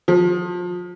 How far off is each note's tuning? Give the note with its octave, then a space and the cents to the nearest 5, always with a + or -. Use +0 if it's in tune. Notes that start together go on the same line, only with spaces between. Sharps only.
F3 +30